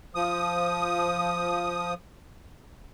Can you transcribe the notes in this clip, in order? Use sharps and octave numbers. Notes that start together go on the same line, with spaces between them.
F3 D#6